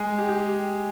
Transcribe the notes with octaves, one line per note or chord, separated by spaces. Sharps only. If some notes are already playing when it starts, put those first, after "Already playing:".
Already playing: G#3 G#4
G4
G4